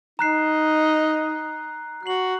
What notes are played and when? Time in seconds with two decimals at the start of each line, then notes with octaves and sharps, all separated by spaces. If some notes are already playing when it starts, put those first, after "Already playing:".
0.19 D#4 A#5 F#6 C7
2.03 F#4 F#6 C7 F#7